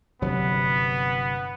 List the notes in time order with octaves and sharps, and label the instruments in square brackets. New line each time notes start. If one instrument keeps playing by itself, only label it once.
[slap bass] G1 C3 F#3 [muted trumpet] B3